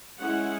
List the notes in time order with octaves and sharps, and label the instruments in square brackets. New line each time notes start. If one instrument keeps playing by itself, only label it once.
[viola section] G#3 C#4 E4 F#5